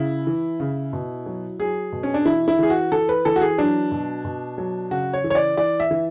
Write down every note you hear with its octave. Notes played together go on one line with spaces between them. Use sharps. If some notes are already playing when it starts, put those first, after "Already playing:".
Already playing: C#3 E4
E3
C#3
B2
F#3
F#3 G#4
B2
C#4
D4
E3 E4
E4
E3 G#4
F#4
E3 A4
B4
E3 A4
F#4
G#4
F#3 D4
B2
B2
F#3
C#3 F#4
C#5
E3
C#5
D5
E3 D5
E5
E3